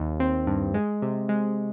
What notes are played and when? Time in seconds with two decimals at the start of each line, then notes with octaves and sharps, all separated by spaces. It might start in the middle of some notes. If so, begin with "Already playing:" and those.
Already playing: D#2
0.20 C4
0.47 G2
0.74 G#3
1.02 C3
1.29 G#3